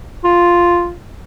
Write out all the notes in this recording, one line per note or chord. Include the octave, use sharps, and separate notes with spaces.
F4